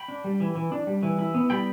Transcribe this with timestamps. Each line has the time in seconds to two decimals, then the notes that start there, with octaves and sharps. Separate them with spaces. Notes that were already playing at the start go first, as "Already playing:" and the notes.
Already playing: G5 B5
0.08 D4
0.24 G3
0.40 E3
0.55 E3
0.72 D4
0.87 G3
1.03 E3
1.19 E4
1.34 B3
1.50 G3 G5 B5